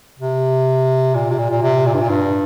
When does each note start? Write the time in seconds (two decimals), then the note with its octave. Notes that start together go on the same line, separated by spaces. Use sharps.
0.18 C3
1.15 A#2
1.31 C3
1.38 A#2
1.50 A#2
1.62 C3
1.86 A#2
1.94 G2
2.00 A#2
2.10 G2